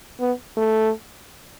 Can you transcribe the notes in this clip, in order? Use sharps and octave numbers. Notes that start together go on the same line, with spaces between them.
B3
A3